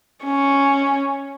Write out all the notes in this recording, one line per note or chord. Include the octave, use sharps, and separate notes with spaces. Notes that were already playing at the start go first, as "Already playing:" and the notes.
C#4